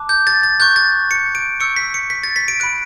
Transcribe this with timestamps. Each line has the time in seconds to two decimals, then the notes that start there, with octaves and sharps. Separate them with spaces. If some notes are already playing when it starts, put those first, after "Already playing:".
Already playing: A5 D6 F#6
0.09 G6
0.27 A6
0.43 A6
0.60 C#6 F#6 G6
0.76 A6
1.11 C#7
1.35 D7
1.60 C#6 E6 G6 C#7
1.76 B6
1.94 C#7
2.10 B6
2.24 A6
2.36 B6
2.48 D7
2.60 B5 F#6 D7